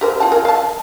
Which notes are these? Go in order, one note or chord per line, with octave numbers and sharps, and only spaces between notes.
G4 A#4 C5
F4 G5 A5
A#4 G#5
F5 A5